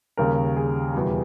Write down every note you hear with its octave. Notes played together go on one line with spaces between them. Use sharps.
D#2 C#3 G3 A#4
G#4
E2 B2 G3